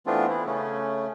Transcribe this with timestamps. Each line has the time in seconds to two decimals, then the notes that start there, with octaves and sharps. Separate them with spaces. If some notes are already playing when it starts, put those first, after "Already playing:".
0.06 E3 A3 B3 C4 D4 F4
0.29 E3 E4
0.46 C#3 A3 C#4